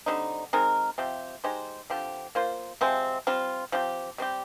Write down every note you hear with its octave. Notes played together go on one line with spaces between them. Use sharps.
D3 G3 C4 D#4
G#3 C4 D#4 A#4
C3 F3 C4 G4
G#3 D#4 G4 C5
D3 F3 C4 G4
A#3 F4 C5
C3 F3 G#3 C4
G3 C4 F4
F3 C4 G4
G3 C4 G4